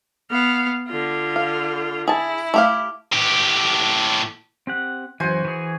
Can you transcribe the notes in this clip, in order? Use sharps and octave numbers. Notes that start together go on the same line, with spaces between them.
B3 F5
D3 F4
F5
E4 G#4 A5
A3 G4 F5
A2 G4
C4 G4 F#5
F#2 E3 F#4 C5 G#5
E3 G#4